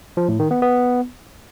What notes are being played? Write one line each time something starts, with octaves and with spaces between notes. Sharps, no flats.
F3
A2
D#3
B3
B3